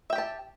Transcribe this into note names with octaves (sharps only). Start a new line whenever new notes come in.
G4 E5 G5 A5